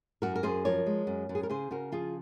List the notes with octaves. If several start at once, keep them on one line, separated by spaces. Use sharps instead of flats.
F#2 F#4 A#4
A#4
F#2 G#4 C5
F3 A#4 C#5
G#3
F#2
F#2
G#4
A#4
C#3 G#4 C5
C#3 F#4 A#4
F3 F4 G#4